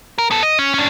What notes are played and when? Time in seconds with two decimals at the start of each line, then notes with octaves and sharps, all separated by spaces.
0.18 A#4
0.31 B3 A4
0.43 D#5
0.59 C#4
0.74 C#4 D4